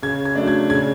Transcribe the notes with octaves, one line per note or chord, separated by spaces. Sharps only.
C#3 G#6
G#6
F#3 A3 D4
G#6
C#3 G#6